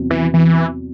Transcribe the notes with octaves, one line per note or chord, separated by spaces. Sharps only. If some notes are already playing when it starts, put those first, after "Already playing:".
Already playing: E2 C3 F#3
E3
E3